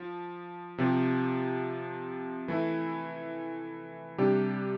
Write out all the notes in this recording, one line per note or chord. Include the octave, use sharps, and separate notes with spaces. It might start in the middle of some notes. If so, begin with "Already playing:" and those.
Already playing: F3
C3 F3 C4 G4
E3 A3 E4
C3 G3 D4 G4